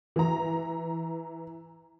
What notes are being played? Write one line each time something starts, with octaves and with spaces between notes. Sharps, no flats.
E3 A#5